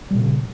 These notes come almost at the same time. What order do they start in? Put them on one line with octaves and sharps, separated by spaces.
G3 A#2 C#3